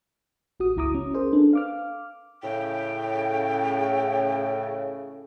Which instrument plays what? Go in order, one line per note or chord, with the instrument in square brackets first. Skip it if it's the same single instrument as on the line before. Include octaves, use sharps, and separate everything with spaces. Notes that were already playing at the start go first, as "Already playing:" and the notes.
[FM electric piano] A1 F#4 D#6
G1 C#2 E4 A#5 D6 D#6
C#4
G#4 A#4 C5
D4 A4 B4
F5 D6 F6
[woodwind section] A2 C#3 [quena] G5